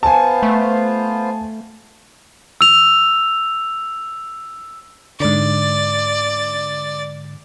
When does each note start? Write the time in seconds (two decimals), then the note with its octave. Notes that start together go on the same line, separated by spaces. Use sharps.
0.03 B3 F4 C5 G#5 A5
0.43 A3
2.61 E6 F7
5.20 G#2 D3 D5